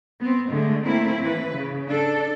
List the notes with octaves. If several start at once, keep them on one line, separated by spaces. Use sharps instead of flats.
B3 C4
D3 G#3 A3
A3 A#3 C4 E4
E3 B4
C#3
D4 A4